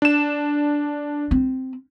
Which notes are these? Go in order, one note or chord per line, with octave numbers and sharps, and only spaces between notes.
D4 E7
C4